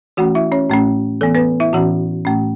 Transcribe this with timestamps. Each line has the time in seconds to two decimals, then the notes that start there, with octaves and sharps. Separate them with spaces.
0.17 E3 A3 C#4 F#4 F#5
0.35 E4 E5
0.52 C#4 C#5
0.70 A2 A3 C#4
1.21 E3 B3 A4
1.35 B3 B4
1.60 E4 E5
1.73 A2 E3 C#4 F#4 F#5
2.25 A2 A3 C#4